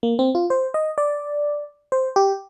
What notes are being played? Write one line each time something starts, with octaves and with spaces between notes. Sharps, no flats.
A#3
C4
F4
C5
D#5
D5
C5
G4